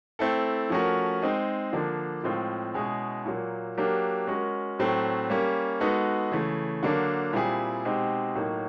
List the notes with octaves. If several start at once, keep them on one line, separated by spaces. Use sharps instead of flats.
A3 C4 E4 A4
F3 A3 C#4 F#4 A#4
G#3 C4 D#4
D3 F3 A#3 D4
A2 F3 G#3 C4 F4
B2 G#3 C#4 E4 G#4
A#2 F#3 A#3
F#3 A#3 D4 G4 A#4
G#3 C#4 F#4 A#4
A2 F#3 A3 C4
G3 A#3 C#4
G#3 B3 D#4 F#4 A4
C#3 E3 A3
D3 F#3 A#3 D4
A#2 G3 C4 E4 G#4
B2 G#3 C4 D#4 G4
A2 F#3 A#3 D#4